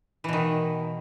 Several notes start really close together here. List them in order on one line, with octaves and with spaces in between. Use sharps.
E3 B2 D#3